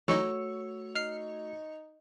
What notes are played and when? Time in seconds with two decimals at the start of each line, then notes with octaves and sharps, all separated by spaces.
0.08 E3 F#3 A3 D#4 F#4 C#5 E6
0.95 D#4 F6 C7